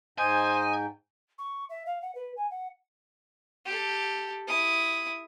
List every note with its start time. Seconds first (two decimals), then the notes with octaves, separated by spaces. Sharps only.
0.18 G#2 C5 D#5 G5 G#5
1.38 C#6
1.70 E5
1.86 F5
2.02 F#5
2.15 B4
2.36 G#5
2.51 F#5
3.65 G4 A4
4.47 E4 D#6